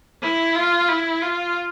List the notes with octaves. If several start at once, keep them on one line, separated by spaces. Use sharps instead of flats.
E4
F4
E4
F4